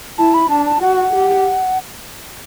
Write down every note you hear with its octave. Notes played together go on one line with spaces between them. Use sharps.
E4 A5
B5
D4 A5
A5
F#4 F#5
F#5
G4